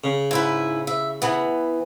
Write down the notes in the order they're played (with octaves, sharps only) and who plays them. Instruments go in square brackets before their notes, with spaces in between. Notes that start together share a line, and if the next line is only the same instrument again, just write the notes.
[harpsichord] C#3
[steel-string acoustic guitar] G#2 E4 B4
E5
E3 B3